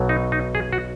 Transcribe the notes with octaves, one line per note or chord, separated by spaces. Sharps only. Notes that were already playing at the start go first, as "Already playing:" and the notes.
Already playing: B1 B2 F#3
D#4
D#4
G#4
F#4